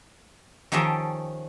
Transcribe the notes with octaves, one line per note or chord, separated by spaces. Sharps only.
D#3 F3 C#4 G4 A4 D#5